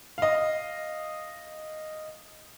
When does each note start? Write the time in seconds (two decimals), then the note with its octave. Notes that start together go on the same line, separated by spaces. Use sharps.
0.18 D#5 F5